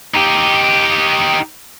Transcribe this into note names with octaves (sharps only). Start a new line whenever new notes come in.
D#4 G4